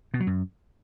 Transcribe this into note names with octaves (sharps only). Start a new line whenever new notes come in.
B2
F#3
F#2